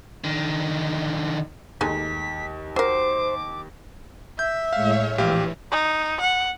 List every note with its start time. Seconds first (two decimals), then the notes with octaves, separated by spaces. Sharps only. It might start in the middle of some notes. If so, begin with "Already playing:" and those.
0.24 D3 D#3
1.81 D#2 G#3 A3 D#4 B6
2.76 F#3 A#4 C5 D6
4.39 E5 G6
4.73 A2 G#3 C#5 F5
5.18 A#1 E3 G4 F5
5.71 D#4
6.20 F#5